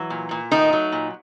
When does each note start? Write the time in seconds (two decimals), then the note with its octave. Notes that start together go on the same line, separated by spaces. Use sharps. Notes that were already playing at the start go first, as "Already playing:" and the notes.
Already playing: E3 F#3
0.10 A#2
0.31 A#2
0.51 D#3 A3 D#4
0.73 F#3
0.92 A#2